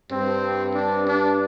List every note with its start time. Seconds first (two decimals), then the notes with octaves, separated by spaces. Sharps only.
0.11 G2 C4
0.74 D4
1.07 D4